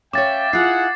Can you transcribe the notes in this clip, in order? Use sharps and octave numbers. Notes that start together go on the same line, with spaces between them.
C#4 C#5 E5 F5 G5 D6 A6
E4 F4 G#4 F#5 C7